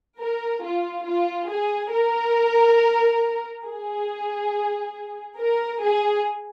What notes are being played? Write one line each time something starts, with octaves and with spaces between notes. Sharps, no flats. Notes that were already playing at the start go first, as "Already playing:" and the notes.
A#4
F4
F4
G#4
A#4
G#4
A#4
G#4